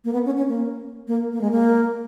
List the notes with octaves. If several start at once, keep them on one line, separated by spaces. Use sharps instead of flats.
A#3
B3
C#4
C#4
A#3
A#3
A#3
G#3
A#3